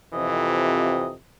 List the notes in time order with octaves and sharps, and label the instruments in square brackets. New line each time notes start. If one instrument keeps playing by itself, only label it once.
[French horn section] F2 C3 [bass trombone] E3 [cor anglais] D#5